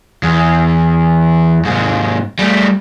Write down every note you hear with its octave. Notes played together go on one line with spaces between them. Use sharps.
E2
G#2 C3
G3 A3